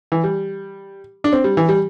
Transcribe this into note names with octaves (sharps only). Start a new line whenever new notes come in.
E3
G3
D4
C4
G3
E3
G3